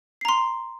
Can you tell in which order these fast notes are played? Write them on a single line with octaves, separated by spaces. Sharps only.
C7 A#5 C6